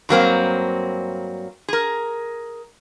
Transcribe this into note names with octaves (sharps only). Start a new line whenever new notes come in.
G2 F#3 A#3 C4
G#4 A#4